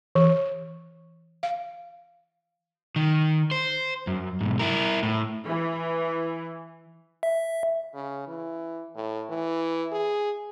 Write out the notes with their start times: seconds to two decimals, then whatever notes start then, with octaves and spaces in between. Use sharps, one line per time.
0.15 E3
1.43 F5
2.96 D#3
3.51 C5
4.07 F#2
4.41 B1 G#2
4.59 E4 A#4
5.03 A2
5.48 E3
7.23 E5
7.94 C#3
8.27 E3
8.95 A2
9.29 E3
9.92 G#4